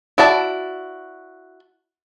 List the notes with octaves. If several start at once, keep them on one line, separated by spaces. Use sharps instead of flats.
E4 F#4 D5 A5